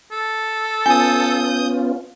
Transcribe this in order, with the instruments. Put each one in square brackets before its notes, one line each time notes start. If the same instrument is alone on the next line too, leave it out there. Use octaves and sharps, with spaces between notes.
[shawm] A4
[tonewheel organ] B3 C#4 F4 [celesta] G#5 [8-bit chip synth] D#6 G6